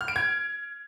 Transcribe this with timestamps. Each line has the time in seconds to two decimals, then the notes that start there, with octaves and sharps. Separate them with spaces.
0.01 F6
0.08 D7
0.16 G#6